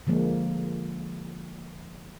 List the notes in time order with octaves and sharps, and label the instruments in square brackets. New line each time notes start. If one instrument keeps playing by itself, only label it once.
[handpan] D3 F3 G#3 A#3